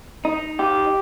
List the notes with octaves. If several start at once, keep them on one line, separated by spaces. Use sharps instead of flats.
D#4
G4